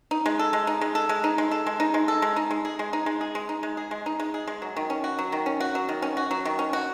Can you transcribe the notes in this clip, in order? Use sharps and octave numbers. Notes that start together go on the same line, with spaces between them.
D#4
G#3
A4
G#3
D#4
G#3
A4
G#3
D#4
G#3
A4
G#3
D#4
G#3
A4
G#3
D#4
G#3
G#4
G#3
D#4
G#3
G#4
G#3
D#4
G#3
G#4
G#3
D#4
G#3
G#4
G#3
F#3
D#3
C#4
F#4
F#3
D#3
C#4
F#4
F#3
D#3
C#4
F#4
F#3
D#3
C#4
F#4